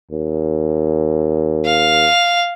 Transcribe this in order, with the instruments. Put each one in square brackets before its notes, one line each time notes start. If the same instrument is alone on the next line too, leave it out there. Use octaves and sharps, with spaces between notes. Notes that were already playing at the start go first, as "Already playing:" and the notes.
[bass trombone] D#2
[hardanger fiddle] F5